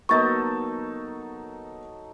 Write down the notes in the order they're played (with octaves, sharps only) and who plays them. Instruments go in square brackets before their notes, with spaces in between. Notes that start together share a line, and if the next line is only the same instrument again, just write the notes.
[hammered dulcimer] F#3 D#4 A4 [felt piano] A#3 B3 A6 [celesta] C#6